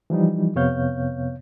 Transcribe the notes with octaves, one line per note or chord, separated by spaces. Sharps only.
E3 F3 G3 D#4
F2 C3 B3 C#5 F5 G6